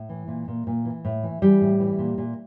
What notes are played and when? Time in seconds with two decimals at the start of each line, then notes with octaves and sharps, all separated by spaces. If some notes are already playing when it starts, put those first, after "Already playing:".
Already playing: A2
0.09 E3
0.28 A#2
0.48 A#2
0.67 A#2
0.85 E3
1.05 A2
1.23 E3
1.42 E3 G3
1.61 A2
1.80 E3
1.98 A#2
2.18 A#2